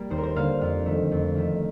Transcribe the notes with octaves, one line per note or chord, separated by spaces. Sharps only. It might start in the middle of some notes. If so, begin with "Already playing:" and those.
Already playing: G3 A#3
D#2 C5
A#4
C5
D3 G3 A#3 F5
F2 F5
D#3 A3
F2
D#3 A3